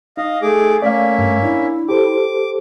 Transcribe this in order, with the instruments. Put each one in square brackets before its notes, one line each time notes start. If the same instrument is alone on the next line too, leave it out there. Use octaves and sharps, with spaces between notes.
[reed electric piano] D#4 [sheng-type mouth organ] D#5 F5
[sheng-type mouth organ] A3 G#4 D6
[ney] A3 [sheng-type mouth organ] A#3 C#4 E5 [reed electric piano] D5 F5
[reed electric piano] G2
[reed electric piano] D4 [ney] E4
[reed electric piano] G4 A4 C5 [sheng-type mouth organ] D6